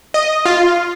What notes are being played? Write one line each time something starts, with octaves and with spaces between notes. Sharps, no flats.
D#5
F4